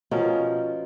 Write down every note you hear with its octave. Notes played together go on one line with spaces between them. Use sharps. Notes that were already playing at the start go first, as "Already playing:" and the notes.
B2 F3 C#4 A#4